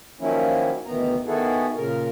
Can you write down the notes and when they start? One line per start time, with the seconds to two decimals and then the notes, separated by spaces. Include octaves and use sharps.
0.20 D#3 F3 F#3 A#3 C#4 E4
0.86 D2 B2 D#3 E3 B3 A#5
1.26 D#3 B3 E4 F#4 G#4 A4
1.76 A#2 C#3 A#4